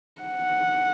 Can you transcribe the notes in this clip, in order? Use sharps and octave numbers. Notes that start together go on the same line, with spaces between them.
F#5